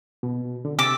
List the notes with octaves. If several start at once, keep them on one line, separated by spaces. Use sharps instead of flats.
B2
D3
C3 D6 E6 A6